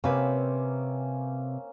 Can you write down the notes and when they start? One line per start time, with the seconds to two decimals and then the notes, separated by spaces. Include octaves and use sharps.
0.04 C3 A#3 C4 C#4 B4